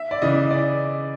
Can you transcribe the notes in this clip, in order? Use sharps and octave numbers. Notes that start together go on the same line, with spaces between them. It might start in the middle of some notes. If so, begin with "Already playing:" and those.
Already playing: E5
D5
C#3 E3 D#5
D5